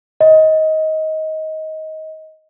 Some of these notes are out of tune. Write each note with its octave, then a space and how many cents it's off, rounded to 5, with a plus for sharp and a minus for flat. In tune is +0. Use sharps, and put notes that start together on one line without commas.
D#5 +20